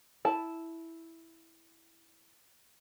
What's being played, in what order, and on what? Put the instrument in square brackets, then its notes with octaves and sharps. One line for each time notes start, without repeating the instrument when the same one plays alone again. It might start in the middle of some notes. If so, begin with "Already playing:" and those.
[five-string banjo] E4 A5